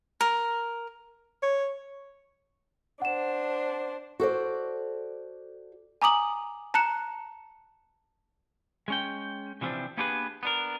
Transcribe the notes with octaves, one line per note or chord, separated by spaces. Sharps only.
A#4
C#5
D4 C5 F#5 E7
F#4 A4 C5 D5
G#5 A#5 D6 D#6 F#7
A5 A#5 F#6 C#7 E7
G#3 C#4 G5
C3 E3 F3 A#3 C4 D4
A#3 B3 D4 G4 G#4 B4
B3 D4 A#4